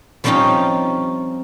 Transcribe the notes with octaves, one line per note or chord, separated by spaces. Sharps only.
F3 G3 C4 C#4 D#4 F4